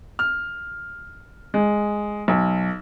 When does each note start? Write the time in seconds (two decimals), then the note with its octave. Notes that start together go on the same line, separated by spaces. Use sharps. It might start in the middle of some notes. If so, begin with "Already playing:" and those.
0.19 F6
1.54 G#3
2.28 B1